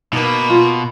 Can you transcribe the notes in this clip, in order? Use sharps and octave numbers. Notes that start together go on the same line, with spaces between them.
B2 A#3 D#4 B4
F4